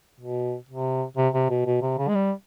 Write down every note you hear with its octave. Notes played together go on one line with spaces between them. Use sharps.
B2
C3
C3
C3
B2
B2
C3
C#3
G#3
G3